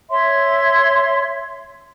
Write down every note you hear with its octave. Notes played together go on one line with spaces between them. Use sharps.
C#5 E5 C6